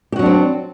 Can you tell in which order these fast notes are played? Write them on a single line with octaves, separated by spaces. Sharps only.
G4 F#4 F#3 D4 C4